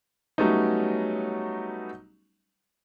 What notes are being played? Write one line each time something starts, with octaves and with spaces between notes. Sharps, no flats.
F#3 G3 A3 B3 C#4 D#4